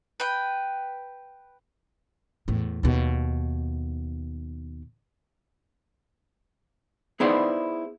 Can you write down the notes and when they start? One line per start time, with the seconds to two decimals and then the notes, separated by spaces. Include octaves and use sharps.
0.20 B4 G5
2.48 E2 A2
2.83 D#2 B2
7.20 B3 D#4 E4 G#4 C5 D5